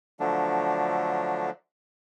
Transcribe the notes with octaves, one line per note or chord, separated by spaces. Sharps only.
D3 F3 F#3 A3 D4